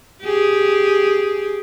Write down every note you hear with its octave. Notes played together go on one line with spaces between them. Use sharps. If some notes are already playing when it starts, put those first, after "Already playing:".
G4 G#4